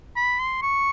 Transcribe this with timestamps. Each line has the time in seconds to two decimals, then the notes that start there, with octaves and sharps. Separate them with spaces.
0.16 B5
0.40 C6
0.63 C#6